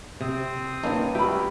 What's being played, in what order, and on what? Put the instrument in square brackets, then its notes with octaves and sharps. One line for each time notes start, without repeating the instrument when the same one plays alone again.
[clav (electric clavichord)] C3 [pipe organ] C4 D#6
[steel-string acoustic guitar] G2 D#3 [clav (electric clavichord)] A#3 C#4 D#4
[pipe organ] D2 [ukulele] G4 B5 [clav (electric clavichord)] E5 G5